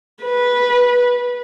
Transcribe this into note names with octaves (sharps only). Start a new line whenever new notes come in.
B4